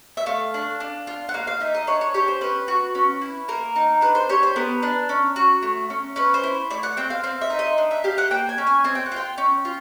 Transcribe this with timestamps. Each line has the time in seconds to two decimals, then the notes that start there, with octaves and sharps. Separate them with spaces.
0.17 E5
0.26 A3 F5
0.54 D4
0.80 D4
1.07 F4
1.29 F#5
1.34 A#3 F5
1.47 F5
1.60 D#4 E5
1.74 D#5
1.87 D4 C#5
2.01 C#5
2.14 G4 C#5
2.28 C5
2.41 C#4 B4
2.68 F#4
2.95 C#4
3.21 E4
3.48 A#3 A#4
3.76 D#4
4.01 D4 B4
4.15 C5
4.29 G4 C#5
4.43 C5
4.56 B3 A#4
4.83 D4
5.09 C#4
5.36 F#4
5.63 A3
5.90 C#4
6.16 C#4 B4
6.34 C5
6.43 E4
6.70 A3 D5
6.83 F#5
6.97 C4 G5
7.10 F5
7.23 C4 F5
7.41 E5
7.50 D#4
7.59 D#5
7.78 D4
7.91 E5
8.04 G4 F5
8.18 F#5
8.31 A#3 G5
8.49 G#5
8.58 C#4
8.67 G#5
8.84 C4 G#5
8.95 G5
9.06 F#5
9.12 F4 G5
9.38 C#4
9.65 F4